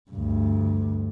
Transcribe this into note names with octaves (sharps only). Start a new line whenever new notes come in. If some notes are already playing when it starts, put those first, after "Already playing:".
D2 G2